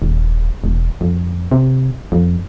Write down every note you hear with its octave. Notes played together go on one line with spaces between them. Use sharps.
D#1
E1
F2
C3
F2